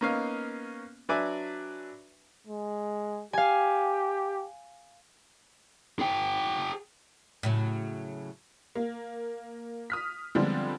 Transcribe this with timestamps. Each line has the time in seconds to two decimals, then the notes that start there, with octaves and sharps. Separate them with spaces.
0.01 A#3 B3 C#4 D#4 F5
1.09 F#3 D4 B4 D5 E5 G#5
2.46 G#3
3.33 G4 F5 G#5
5.99 G#4 G5
7.43 A2 C#3 F#3
8.76 A#3
9.90 D#6 F6 B6
10.35 D3 F3 G3 G#3 B3 C4